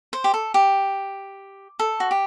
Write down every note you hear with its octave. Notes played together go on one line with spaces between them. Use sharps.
C5
G4
A4
G4
A4
F#4
G4